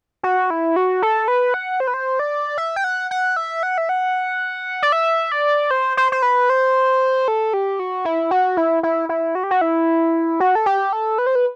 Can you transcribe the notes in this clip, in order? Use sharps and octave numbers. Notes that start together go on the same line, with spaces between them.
F#4
E4
F#4
A4
B4
F#5
C5
B4
C5
D5
E5
G5
F#5
F#5
E5
F#5
E5
F#5
D5
E5
D5
C5
C5
C5
B4
C5
A4
G4
F#4
E4
F#4
E4
E4
E4
F#4
G4
F#4
E4
F#4
A4
G4
A4
B4
C5
B4